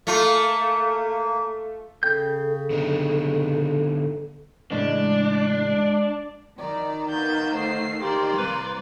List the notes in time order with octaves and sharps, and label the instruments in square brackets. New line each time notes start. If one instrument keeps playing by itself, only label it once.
[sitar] A3 F4 [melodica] A#3
[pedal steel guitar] C#3 G5 G6 [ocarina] A4
[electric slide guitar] D3 B3 D#4
[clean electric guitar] E2 A2 C#3 [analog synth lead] G#3 [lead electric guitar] D4
[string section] D#3 [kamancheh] D5 A#5
[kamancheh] A#3 B3 [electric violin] G6 A6
[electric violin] A3 C7 [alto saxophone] C5
[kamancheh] A#3 [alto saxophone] G4 [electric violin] C5 D5
[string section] C2 [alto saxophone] B4